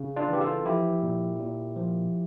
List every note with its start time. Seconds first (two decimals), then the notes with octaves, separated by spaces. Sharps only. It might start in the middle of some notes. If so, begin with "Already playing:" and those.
Already playing: C#3
0.16 D4 F4
0.29 E3 G4
0.41 F4 A4
0.65 F3 E4 G4
1.02 A#2
1.39 A#2
1.76 F3